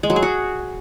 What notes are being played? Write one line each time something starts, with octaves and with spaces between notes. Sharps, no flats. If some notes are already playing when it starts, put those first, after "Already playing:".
G#3
F#3
G#4
F#4